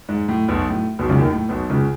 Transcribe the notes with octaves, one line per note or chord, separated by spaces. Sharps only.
G#2
A2
B1 B2
A2
B1 B2
C#2 C#3
D#2 D#3
A2
B1 B2
C#2 C#3